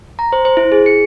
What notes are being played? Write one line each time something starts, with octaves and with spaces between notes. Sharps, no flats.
A#5
C5
C5
E4
G#4
C#7